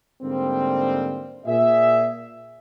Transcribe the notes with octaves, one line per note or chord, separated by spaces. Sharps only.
G#2 D3 G3 A#3 C4
A#2 G#4 E5